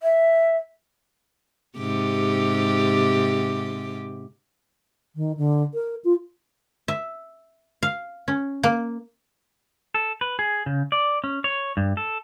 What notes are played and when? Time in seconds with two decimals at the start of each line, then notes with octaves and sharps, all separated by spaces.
0.03 E5
1.78 G#2 C3 G4
5.16 D#3
5.37 D3
5.74 A#4
6.04 F4
6.88 E5
7.83 F5
8.28 C#4
8.63 A#3
9.94 A4
10.21 B4
10.39 G#4
10.66 C#3
10.92 D5
11.24 C#4
11.44 C#5
11.77 G2
11.97 A4